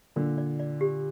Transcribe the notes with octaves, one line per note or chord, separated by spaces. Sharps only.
A#2 D3 A#4
D5
D5
G4